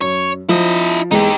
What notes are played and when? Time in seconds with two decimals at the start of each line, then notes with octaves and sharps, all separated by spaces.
0.01 F#2 C#5
0.49 F3 E4 D#5
1.11 E2 G#3 D#4 G4